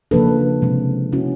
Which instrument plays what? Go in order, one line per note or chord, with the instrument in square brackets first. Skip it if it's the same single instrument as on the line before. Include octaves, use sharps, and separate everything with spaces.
[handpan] C#3 F3 A#3 D4 A4 B4
C3 F3 G#3 C4
C#3 F3 A#3 C#4 E4 F#4